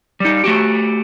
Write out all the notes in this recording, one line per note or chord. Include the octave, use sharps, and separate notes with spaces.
G3 D#4
A3 F#4 G4